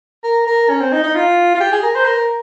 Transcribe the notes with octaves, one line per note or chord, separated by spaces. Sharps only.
A#4
A#4
C#4
C4
D#4
D#4
F4
F4
G4
G#4
A#4
C5
A#4